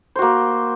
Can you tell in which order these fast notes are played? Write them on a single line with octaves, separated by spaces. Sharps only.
C5 F#4 A#3